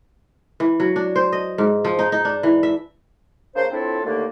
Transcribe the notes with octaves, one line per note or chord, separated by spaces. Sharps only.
E3
F#3
D4
C5
D#5
G#2
F3
D#4
D#4
D4
E3
E5
C#3 A#3 D4 C5
A2 C4 D4 E4 F4 A4
D#2 D3 A3 A#3